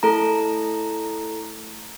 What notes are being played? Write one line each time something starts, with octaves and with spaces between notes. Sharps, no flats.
A3 E4 A4 A#5